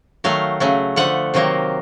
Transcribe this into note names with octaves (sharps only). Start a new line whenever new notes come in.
D#3 F#3 A3 F5
C#3 F#3 A3
D3 F3 A3 F#5
C3 D#3 F#3 A#3